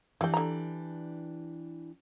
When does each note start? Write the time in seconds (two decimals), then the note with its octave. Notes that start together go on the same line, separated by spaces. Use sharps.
0.21 E3 D4 E4 G4 G5
0.34 D3 A#5